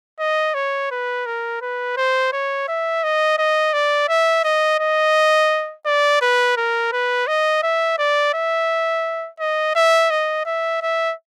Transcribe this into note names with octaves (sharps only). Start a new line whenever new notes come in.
D#5
C#5
B4
A#4
B4
C5
C#5
E5
D#5
D#5
D5
E5
D#5
D#5
D5
B4
A#4
B4
D#5
E5
D5
E5
D#5
E5
D#5
E5
E5